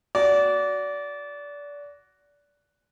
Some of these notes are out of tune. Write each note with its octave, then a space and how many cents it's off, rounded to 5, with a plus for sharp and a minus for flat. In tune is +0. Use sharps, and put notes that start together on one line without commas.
F#4 +0 D5 -25